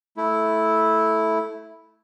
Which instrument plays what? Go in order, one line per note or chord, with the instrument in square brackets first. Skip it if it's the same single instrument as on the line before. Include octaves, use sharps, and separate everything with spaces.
[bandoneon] A3 E4